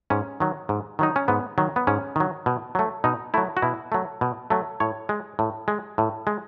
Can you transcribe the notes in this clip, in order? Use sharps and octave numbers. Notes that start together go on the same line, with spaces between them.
G#2 C#4
D#3 F#3
G#2
D#3 F#3 D#4
C#4
G#2 B3
D#3 F#3
B3
G#2 C#4
D#3 F#3
B2
F#3 A3
B2 D#4
F#3 A3 E4
F#4
B2 E4
F#3 A3
B2
F#3 A3
A2 C#5
G#3
A2
G#3
A2
G#3